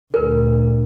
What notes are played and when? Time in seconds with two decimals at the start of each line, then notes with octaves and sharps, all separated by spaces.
0.14 D2 A#2 A#4 B4